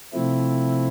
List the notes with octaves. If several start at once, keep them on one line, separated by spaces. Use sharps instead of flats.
C3 F3 A3 C4 E4